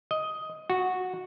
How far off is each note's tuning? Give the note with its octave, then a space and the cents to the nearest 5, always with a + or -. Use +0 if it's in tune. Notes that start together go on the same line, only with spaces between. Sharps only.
D#5 +10
F#4 -10